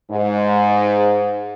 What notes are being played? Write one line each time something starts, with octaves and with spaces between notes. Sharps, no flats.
G#2